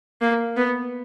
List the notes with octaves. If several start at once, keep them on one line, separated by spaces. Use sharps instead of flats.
A#3
B3